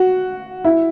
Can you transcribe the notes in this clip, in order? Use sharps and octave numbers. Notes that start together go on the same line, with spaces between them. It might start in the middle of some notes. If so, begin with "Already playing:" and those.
Already playing: F#4
E4